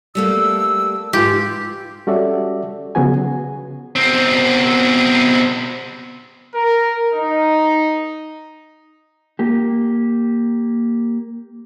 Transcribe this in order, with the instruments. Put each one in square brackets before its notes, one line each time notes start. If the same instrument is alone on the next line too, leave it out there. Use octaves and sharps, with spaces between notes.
[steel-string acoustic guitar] G3 A3 A#3 [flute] E6
[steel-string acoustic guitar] G#2 E4 [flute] F4 [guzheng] G4
[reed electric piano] G3 C#4 F#4 A4 D5 E5
C#3 F3 F#3 B3 F#4 G#5
[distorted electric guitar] B2 C4
[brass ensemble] A#4
D#4
[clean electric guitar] A#3 G4